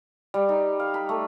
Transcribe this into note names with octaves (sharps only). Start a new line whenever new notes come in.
G3
D#4
F5
B5
A3